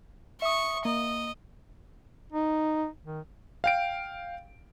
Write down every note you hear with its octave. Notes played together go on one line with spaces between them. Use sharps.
E5 C#6 D#6
A#3 D#5
D#4
D#3
F5 G5 D7